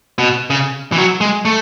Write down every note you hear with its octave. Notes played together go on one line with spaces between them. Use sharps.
B2
C#3
E3
F#3
G#3
A3